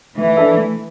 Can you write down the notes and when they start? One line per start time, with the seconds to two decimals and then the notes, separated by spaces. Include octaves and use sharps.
0.17 E3 A3
0.37 D4 A4 E5
0.57 A3